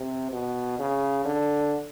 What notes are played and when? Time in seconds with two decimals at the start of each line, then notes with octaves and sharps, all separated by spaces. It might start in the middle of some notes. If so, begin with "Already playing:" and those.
Already playing: C3
0.32 B2
0.79 C#3
1.25 D3